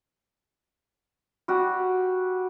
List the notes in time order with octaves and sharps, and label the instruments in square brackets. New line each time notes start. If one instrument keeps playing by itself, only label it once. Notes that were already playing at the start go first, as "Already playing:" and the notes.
[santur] G3 F#4 G4